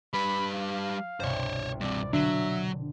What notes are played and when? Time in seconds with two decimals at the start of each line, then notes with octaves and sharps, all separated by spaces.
0.14 G3 B4 B5
0.54 F5
1.20 G1 C2 B2 C5 C#5
1.81 G2 C4 D5
2.13 D3 F#3 D4 E5